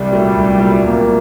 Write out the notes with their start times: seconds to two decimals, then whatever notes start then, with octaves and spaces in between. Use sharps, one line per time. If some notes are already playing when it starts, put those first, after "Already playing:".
Already playing: C2 G3
0.11 A#2 F#3 A3
0.35 C2
0.59 A#2 F#3 A3
0.84 C2 A#3